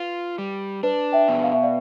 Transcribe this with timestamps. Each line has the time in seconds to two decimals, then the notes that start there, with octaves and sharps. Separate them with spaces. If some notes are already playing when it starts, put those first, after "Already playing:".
Already playing: F4 B4
0.38 G3
0.83 D4 B4
1.13 E5 G5
1.28 B2
1.43 F5
1.53 E5
1.62 D5 F5